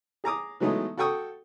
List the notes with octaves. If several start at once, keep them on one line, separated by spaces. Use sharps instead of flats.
G#4 A#5 D6 D#6
E3 F#3 G#3 A3 B3 D#4
F#4 A4 G5 C#6 D#6